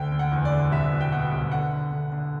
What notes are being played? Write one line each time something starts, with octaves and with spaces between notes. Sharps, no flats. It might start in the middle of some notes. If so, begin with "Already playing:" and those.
Already playing: D2 D3 G5
D3
F#5
E2
D5
D3
C2 E5
B2
G5
B2 F#5
C2
D3 F#5
D3
D3
D3